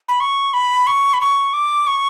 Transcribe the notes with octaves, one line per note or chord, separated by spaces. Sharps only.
B5
C#6
B5
C#6
B5
C#6
D6
C#6